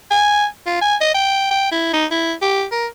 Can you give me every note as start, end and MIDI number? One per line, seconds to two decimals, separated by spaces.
0.11 0.46 80
0.66 0.77 65
0.81 0.96 80
1.01 1.12 75
1.14 1.50 79
1.51 1.69 79
1.71 1.92 64
1.93 2.06 63
2.11 2.33 64
2.42 2.65 67
2.72 2.87 70